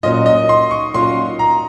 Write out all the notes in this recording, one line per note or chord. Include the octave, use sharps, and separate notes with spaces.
A#2 F#3 C#4 F4 D#5
D#5
C6
C#6
A#2 F#3 C#4 F4 C6
A#5